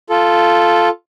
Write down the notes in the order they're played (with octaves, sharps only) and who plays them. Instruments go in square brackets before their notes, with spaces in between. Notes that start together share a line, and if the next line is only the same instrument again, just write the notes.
[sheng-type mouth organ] F4 A4